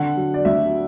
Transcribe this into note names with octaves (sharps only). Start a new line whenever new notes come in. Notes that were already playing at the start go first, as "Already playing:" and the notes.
Already playing: D3 F#5
F#3
D5
D2 E5